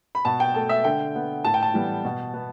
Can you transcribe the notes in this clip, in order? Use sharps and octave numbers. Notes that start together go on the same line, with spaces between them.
B5
B2 A5
G5
A3 A5
E5
D3 G5
B3
A2 A5
G5
A5
E3 G3 B3
B2
B3